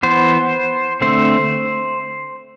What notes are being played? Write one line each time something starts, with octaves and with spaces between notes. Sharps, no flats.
E3 B3 C5
D3 A3 C4 C5